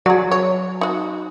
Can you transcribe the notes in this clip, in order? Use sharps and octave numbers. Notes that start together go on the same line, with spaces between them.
F#3 G#4 D5
C#5
D#4 F#4